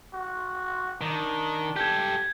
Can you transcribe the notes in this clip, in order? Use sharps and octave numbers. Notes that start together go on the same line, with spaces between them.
F#4
D#3 D4
G4 A4 G6 G#6